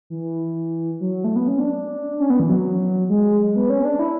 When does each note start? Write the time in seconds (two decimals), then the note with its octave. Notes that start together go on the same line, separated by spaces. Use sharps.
0.10 E3
1.01 F#3
1.24 A3
1.36 B3
1.48 C#4
1.60 D4
2.20 C#4
2.30 B3
2.40 E3
2.49 F#3
3.10 G#3
3.55 B3
3.70 C#4
3.85 D4
3.99 E4